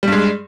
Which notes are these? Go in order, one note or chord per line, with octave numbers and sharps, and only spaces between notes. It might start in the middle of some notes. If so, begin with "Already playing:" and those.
G2 G3 G#3